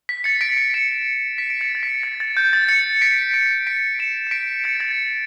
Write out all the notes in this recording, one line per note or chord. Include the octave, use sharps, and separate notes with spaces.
B6
A6 C#7
B6 D7
B6 D7
C#7 E7
B6 D7
D7
A6 C#7
A6
B6
A6
A6
G6
A6
A6 C#7
B6 D7
B6 D7
B6 D7
C#7 E7
C#7
B6 D7
A6 C#7
A6